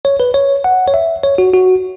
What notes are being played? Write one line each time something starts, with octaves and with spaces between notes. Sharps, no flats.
C#5
B4
C#5
F#5
C#5
E5
C#5
F#4
F#4